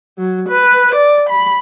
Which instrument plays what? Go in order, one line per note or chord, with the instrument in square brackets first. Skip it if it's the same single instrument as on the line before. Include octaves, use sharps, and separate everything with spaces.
[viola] F#3
B4
D5
B5